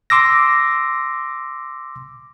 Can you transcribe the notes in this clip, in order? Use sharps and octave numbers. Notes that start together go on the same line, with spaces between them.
C6 D6 E6 A#6